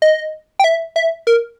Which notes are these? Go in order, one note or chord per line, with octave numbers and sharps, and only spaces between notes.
D#5
G5
E5
E5
A#4